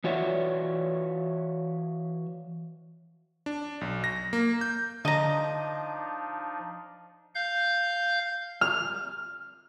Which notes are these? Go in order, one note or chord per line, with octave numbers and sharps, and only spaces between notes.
E3 F#4 C#5 D5 E5
D4
B1
A#6
A#3
G6
D3 F3 D4 D#4 D#5 A#5
F5 G6
F6